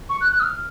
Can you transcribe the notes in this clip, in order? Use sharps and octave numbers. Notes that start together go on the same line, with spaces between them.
C#6
F#6
F#6
D#6
F6